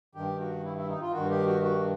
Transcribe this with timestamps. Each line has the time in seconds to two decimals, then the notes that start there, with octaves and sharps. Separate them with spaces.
0.15 G2 D#3 G4
0.40 F#4
0.64 E4
0.77 E4
0.89 D#4
1.01 F4
1.13 G2 D#3 F#4
1.30 G4
1.46 F#4
1.62 F#4